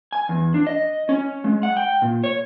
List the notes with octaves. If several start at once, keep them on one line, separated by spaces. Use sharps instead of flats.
G#5
E2
D4
D#5
C#4
G#3
F#5
G5
A#2
C#5